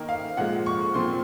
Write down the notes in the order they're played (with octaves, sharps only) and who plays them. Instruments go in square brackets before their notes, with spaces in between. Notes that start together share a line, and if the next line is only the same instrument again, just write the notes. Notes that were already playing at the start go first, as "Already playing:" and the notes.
Already playing: [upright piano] D#3 A#3 D#4
F5
A#2 F3 G#3 F#5
C#6
A#2 F3 C4 C6